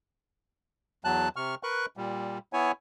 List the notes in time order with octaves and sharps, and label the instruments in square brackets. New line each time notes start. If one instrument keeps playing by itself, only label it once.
[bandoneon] E2 F#3 A5 F#6
C3 C#6 F6
A#4 B4 C#6 F#6
A#2 G3
B3 E4 C#5 G#5